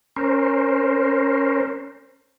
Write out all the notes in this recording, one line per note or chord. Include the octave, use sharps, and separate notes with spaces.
C#4 A#4 C5